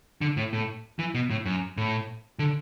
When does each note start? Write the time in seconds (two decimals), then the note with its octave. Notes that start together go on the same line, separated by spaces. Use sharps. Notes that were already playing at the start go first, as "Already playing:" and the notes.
0.21 D3
0.37 A2
0.53 A2
0.99 E3
1.15 B2
1.30 A2
1.45 F#2
1.77 A2
2.39 D3